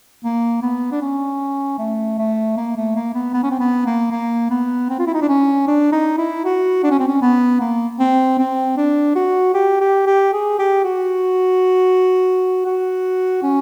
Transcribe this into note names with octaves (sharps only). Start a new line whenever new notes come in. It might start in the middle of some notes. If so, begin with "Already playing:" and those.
A#3
B3
D4
C#4
A3
A3
A#3
A3
A#3
B3
B3
C#4
C4
B3
A#3
A#3
B3
C4
F4
E4
D#4
D4
C#4
D4
D#4
E4
F#4
D4
C#4
C4
C#4
B3
A#3
C4
C4
D4
F#4
G4
G4
G4
G#4
G4
F#4
F#4
C#4